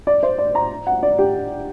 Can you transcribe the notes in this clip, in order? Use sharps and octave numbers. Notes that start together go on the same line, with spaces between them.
D5
C5
D5
A#5
F#5
D5
G4